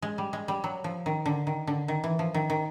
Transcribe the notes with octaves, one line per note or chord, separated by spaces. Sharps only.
G#3
G3
G#3
G3
F#3
F3
D#3
D3
D#3
D3
D#3
E3
F3
D#3
D#3